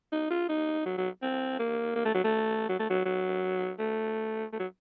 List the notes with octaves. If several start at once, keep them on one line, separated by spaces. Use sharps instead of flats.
D#4
F4
D#4
F#3
F#3
C4
A#3
A#3
A3
F#3
A3
F#3
A3
F#3
F#3
A3
A3
F#3